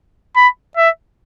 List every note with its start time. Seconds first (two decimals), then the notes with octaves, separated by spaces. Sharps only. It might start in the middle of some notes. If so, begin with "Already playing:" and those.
0.36 B5
0.77 E5